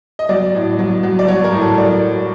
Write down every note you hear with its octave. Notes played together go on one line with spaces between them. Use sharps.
D#5
F#3 D5
A2
F#3
F#3
D5
F#3 C#5
A#4
A2
A4
F#3 D5